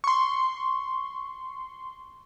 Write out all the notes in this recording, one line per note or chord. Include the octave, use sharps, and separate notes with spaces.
C6 C#6